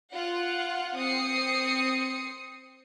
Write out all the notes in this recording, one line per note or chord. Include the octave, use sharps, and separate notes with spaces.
F4 F#5
C4 D#6 C7 C#7